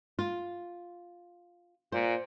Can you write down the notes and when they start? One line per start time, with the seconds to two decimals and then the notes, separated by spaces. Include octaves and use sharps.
0.19 F4
1.92 A#2 C5